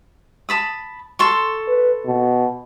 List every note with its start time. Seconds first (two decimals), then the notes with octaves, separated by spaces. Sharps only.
0.49 A5 B5 D#6
1.19 A4 C6 C#6
1.68 B4
2.06 B2